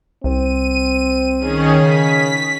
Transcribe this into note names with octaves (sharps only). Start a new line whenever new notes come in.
C2 C4 D#7
D#3 C#4 G#4
C#3 B6